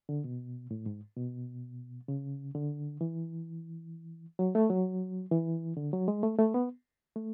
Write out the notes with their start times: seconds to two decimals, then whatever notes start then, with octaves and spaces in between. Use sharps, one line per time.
0.09 D3
0.24 B2
0.71 A2
0.86 G#2
1.17 B2
2.08 C#3
2.55 D3
3.01 E3
4.39 F#3
4.55 A3
4.70 F#3
5.31 E3
5.77 D3
5.93 F#3
6.08 G#3
6.23 A3
6.39 A3
6.54 B3
7.16 A3